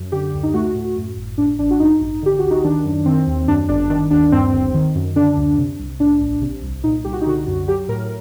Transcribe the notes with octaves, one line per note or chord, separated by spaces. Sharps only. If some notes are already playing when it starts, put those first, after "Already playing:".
Already playing: F#2
D3 G4
D2
D#4
A3 F#4
A2
F#2
G1
A2 D4
A1 D4
F#4
G2 D#4
A1
D3 G4
D2 F#4
D#4
D#3 D4
F#2
D#3 C4
D#2
F#2 D4
G1 D4
D#3 D4
D#2 D4
G2 C4
G1
D#3
F#2
D3 D4
D2
C3
C2
A2 D4
A1
C3
C2
A#2 D#4
C2 G4
F#4
D#4
D3 F#4
F#2
F#3 G4
A2 A#4